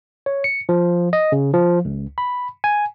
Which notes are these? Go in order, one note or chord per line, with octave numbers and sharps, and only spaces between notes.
C#5
C#7
F3
D#5
C#3
F3
C#2
B5
G#5